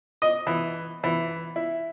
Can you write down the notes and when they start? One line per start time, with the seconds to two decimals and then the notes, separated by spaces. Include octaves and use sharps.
0.22 D#5
0.47 E3
1.04 E3
1.56 E4